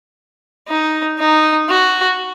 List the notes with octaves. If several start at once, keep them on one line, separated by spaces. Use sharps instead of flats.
D#4
D#4
F#4